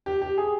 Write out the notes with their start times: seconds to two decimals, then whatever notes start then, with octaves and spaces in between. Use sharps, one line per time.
0.06 G4
0.22 G4
0.38 G#4